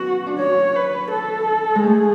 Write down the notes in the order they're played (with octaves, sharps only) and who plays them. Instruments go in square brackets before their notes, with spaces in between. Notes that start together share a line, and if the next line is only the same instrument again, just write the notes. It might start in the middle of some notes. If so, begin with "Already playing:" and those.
Already playing: [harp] F#3 B3 C#4 [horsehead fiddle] F#4
[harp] D4
[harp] C#4 [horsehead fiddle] C#5
[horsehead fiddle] B4
A4
[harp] G#3
[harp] A3 [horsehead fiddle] G#4